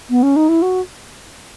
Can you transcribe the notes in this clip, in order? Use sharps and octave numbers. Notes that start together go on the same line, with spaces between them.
B3
C#4
D#4
E4
F#4